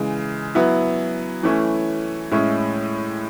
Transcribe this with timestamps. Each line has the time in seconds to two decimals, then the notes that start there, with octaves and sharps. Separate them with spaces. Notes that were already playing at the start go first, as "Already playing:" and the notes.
Already playing: C#3 E3 G#3
0.55 F#3 B3 E4
1.43 E3 A3 C#4 E4
2.32 A2 G#3 C#4 E4